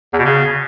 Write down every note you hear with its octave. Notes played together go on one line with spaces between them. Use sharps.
E2
B2
C#3